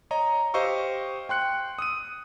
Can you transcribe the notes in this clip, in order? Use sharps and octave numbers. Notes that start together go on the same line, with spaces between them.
C#5 D#5 A#5
G4 C5 D#5 F5 C#6 E6
G5 C6 F#6 C#7
D#6 E6 D#7